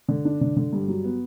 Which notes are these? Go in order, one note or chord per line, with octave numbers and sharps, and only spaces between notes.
D3
D4
D3
D3
G2
F#3
B3